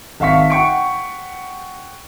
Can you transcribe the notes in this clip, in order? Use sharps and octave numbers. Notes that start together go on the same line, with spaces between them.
G#1 E5 F5 C#6 B6
F#5 G5 C#6 D7